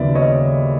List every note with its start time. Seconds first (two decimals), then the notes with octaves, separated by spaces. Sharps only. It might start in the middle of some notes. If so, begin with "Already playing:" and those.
Already playing: D#2 C#3 F#3 B3 D5 E5
0.15 C#5 D#5